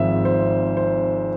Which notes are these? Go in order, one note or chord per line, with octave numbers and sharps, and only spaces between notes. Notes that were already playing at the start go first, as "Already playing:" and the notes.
Already playing: G#1 G#2 F3 C4 E5
C5
C5